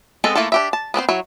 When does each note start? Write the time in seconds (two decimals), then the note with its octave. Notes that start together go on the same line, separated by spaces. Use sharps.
0.24 G#3 B3 C4 A4 D#5
0.35 A3 A#3 E4 F4 A4
0.52 D4 G4 E5
0.73 A5
0.94 B3 C4 D4 C5
1.09 F#3 E4 C#5